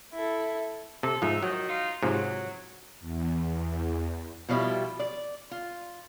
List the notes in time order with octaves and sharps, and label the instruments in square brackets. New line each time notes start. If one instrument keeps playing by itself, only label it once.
[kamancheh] E4 A4
[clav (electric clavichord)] C3 [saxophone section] A4
[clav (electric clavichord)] G#2 F3 [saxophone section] D#4 E5
[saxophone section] D#3 D#5 [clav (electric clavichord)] F#3
[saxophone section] D#4 F4
[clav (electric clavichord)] G#2 C3 F3 [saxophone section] F#3
[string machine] E2
[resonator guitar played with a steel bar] B2 F3 G3 D4 E4 G4
D5
F4